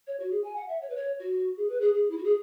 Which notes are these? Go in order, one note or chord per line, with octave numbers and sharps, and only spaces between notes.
C#5
F#4
G#4
G#5
F#5
E5
C#5
B4
C#5
F#4
G#4
B4
G#4
G#4
E4
F#4
G#4